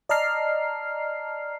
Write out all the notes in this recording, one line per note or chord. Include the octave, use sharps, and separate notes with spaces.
D5 D#5 A5 A#5 F6 C7